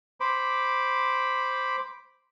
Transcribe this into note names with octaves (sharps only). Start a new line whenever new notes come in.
C5 B5 D6